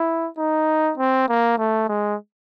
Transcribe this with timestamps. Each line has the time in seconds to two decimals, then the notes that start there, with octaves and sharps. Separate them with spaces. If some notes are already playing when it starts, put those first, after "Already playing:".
Already playing: E4
0.38 D#4
0.98 C4
1.29 A#3
1.58 A3
1.88 G#3